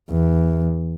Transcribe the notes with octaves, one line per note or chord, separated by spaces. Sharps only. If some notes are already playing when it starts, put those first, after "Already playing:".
E2